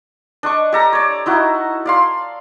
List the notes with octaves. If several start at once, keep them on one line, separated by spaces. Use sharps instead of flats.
D4 D#5 C#6
G4 A4 A#5
C#5 D5
D#4 E4 F#4
D5 F5 C6